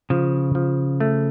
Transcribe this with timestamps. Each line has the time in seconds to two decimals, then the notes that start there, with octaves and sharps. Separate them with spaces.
0.10 C#3 F3
0.55 F3
1.00 A3